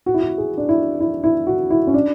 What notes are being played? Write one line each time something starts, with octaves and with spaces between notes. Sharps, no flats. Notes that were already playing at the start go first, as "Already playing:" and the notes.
F#4
E4
F#4
G#4
D4
E4
E4
E4
F#4
E4
C#4
D4